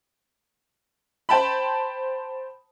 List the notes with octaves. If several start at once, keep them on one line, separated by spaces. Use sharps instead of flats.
C5 G5 A5 B5